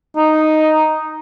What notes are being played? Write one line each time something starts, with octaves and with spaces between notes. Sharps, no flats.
D#4